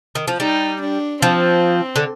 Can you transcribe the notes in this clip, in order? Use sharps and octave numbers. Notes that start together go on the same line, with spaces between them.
D#3
F3
G3 D#4
D4
F3 C4
D3